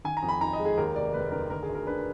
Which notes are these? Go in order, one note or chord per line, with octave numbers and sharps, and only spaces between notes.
D#3 G#5
A#5
F2
B5
D#4 A#5
D#5
G#3
G#4
D#2 A#4
F1 D5
F1 B4
D#3 A#4
D3 A#4
G#4
D2
A#4
D4 B4